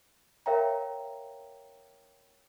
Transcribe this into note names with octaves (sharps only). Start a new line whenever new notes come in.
A#4 C#5 E5 F5 G5 A#5